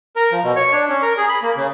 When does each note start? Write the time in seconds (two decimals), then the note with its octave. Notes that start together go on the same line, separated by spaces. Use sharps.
0.16 A#4
0.32 F3
0.44 B2
0.56 C#5
0.72 D4
0.90 C#4
1.02 A#4
1.17 G#4
1.29 B5
1.42 A#3
1.56 C#3